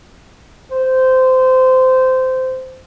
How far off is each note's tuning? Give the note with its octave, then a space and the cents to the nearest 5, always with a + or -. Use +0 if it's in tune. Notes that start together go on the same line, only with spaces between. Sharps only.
C5 -20